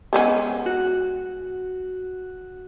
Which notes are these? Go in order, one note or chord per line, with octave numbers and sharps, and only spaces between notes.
G#3 B3 C#4
F#4